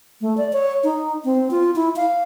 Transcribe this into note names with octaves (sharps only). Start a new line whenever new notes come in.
A3
D5
C#5
D#4
C4
F4
E4
F5